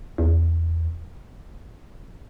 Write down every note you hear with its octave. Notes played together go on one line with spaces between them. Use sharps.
E2